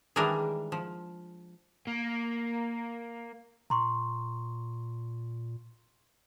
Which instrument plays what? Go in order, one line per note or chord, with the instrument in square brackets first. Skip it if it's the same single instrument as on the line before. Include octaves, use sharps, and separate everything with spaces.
[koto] D#3 E3 G3 G#3 D4 A#4
F3
[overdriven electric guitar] A#3
[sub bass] A#2 [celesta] A#5 C6 C#6